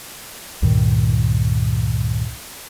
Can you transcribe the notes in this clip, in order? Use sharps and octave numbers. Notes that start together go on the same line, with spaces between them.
C#2 G2 A#2 D#3